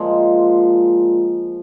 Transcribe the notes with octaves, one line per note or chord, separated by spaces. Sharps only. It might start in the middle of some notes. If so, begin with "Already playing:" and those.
Already playing: A#2 F3 G#3